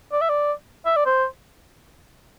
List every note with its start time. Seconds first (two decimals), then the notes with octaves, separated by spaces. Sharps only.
0.12 D5
0.21 E5
0.29 D5
0.86 E5
0.96 D5
1.06 C5